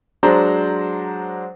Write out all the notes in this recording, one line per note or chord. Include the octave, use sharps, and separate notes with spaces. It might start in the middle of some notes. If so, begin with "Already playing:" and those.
F#3 G#3 D4 C5 A#5